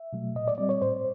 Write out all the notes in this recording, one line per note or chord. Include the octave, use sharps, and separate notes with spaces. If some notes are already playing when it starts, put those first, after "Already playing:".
Already playing: E5
B2 F#3 A3
A#2 D#5
D5
G3 C4 D5
C#5
A2 C5